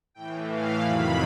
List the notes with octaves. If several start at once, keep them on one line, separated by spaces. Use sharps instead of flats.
A2 E3 G5
F5
F2 C3 D#3 F#3 B5